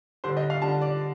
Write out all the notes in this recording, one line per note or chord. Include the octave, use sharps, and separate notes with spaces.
D3 G3 D4 C5
D#5
F5
D3 G3 D4 A5
D5